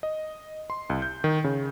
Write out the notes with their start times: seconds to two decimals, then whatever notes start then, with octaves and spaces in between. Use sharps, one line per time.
0.03 D#5
0.70 C6
0.90 C2
1.02 G6
1.24 D#3
1.44 C#3